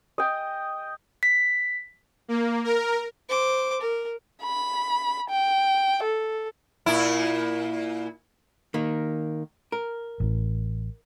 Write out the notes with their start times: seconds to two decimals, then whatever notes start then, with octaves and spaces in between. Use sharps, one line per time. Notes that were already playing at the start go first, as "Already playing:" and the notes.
0.18 D#5 G5
1.23 B6
2.28 A#3
2.64 A#4
3.29 C5 D6
3.81 A#4
4.43 B5
5.30 G5
6.03 A4
6.86 A#2 E4
8.74 D#3 A#3
9.72 A#4
10.20 A1 A2